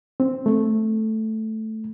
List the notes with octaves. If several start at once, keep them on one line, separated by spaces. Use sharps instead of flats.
C4
A3